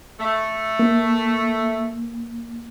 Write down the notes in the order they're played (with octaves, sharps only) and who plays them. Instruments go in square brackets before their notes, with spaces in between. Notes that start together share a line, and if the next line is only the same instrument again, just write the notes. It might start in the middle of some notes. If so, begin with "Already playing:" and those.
[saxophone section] A3
[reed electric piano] A#3